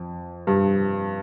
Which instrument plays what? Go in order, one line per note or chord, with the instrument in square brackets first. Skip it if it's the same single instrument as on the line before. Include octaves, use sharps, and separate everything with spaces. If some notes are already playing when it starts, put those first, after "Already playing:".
Already playing: [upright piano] F2
G2